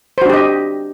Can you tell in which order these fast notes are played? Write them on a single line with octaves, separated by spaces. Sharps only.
C5 F#4 D4 G4 D#5